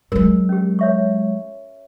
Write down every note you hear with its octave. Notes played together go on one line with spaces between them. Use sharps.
F#3 G#3 A#4
C#4 G4
C#5 E5 C#6